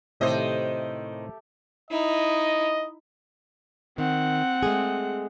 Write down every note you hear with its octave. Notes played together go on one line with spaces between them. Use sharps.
A2 C3 D#3 A3 G4 C5 D#5
D#4 E4 D#5
D#3 C4 F#5
G#3 A3 G#4